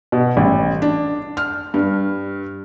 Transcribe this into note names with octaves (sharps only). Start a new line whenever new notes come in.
B2
A1
D4
F6
G2